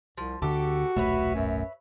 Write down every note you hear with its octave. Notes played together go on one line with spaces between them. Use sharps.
C2 F3
D2 D3 F#4 G4 A4
D#1 B1 A3 B4 C#5 E5
F#2